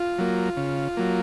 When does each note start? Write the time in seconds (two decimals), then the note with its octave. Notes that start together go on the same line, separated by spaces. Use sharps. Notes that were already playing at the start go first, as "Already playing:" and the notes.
Already playing: F4
0.18 F#3 A#3
0.57 C#3
0.97 F#3 A#3